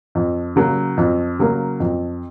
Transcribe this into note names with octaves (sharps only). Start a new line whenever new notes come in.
F2
C#3 F#3 A#3
F2
C#3 F#3 A#3
F2